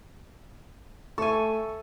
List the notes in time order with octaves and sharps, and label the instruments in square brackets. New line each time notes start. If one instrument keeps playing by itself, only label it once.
[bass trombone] A3 [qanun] A4 G#5 [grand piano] E5 C#6